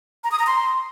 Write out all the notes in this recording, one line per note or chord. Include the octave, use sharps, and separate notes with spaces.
A#5
D#6
A#5
C6